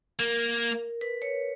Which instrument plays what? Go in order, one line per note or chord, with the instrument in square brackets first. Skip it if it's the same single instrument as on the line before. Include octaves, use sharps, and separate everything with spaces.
[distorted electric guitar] A#3 [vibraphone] A#4
[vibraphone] B4
C#5